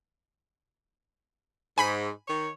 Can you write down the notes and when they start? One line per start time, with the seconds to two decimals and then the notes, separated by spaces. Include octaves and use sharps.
1.78 G#2 G#5 B5 B6
2.28 D#3 C#5